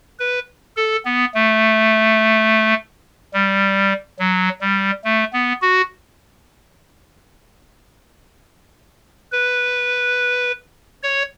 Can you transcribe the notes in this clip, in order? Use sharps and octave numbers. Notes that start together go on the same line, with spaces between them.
B4
A4
B3
A3
G3
F#3
G3
A3
B3
F#4
B4
C#5